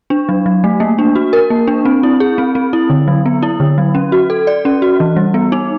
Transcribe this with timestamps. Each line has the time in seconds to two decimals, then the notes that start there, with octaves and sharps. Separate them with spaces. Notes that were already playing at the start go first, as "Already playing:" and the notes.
0.10 D4
0.29 F#3
0.46 F#3
0.64 A3
0.80 A#3
0.98 D4
1.15 F#4
1.33 A#4
1.50 A#3
1.67 D4
1.85 C4
2.03 E4
2.20 G#4
2.38 C4
2.55 C4
2.73 E4
2.90 D3
3.08 F#3
3.26 B3
3.42 E4
3.60 D3
3.78 F#3
3.95 C#4
4.12 F#4
4.30 A4
4.47 D5
4.65 C#4
4.82 F#4
5.00 E3
5.16 G3
5.34 B3
5.52 D#4